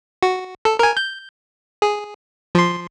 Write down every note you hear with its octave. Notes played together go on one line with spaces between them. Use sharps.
F#4
A4
A#4 G#5
G6
G#4
F3 C6